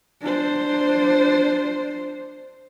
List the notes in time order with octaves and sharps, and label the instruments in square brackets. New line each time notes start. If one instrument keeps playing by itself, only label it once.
[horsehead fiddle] D4 C5